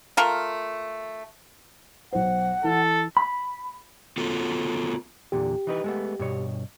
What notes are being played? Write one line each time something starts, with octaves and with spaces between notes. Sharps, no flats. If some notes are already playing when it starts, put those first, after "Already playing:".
A3 F4 A4 A#4
B1 C5 F#5
E3 A4
B5
B3 F4 F#4 A4
E2 A#2 D3 G4
E3 D#4 B4
G#3 A3 B3
G2 B2 C#5